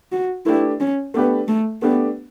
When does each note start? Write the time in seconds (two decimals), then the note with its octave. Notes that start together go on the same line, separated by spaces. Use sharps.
0.12 F#4
0.46 A3 D4 E4 G4 B4
0.80 C#4
1.14 A3 B3 D4 G4 B4
1.48 A3
1.82 A3 B3 D4 G4 B4